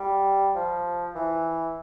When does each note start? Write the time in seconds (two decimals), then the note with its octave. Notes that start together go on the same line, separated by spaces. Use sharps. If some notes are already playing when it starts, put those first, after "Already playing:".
Already playing: G3
0.55 F3
1.15 E3